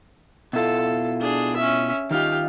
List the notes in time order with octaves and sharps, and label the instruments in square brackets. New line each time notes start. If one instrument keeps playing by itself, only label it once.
[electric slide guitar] B2 E4 F4 [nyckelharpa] A4
[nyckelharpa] D4 G#4
C#4 E5
[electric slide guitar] D#3 D#4 F4 [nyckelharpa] G4 F5